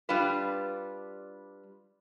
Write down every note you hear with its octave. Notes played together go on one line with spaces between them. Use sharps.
G3 D4 F4 B4